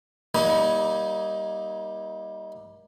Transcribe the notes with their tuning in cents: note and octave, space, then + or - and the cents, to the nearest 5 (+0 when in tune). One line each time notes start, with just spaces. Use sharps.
G3 +0 A#3 +30 D#4 +30